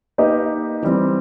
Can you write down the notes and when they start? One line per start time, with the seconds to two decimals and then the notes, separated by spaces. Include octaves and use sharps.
0.18 A#3 D#4 G4 B4 D#5
0.83 E3 G3 C4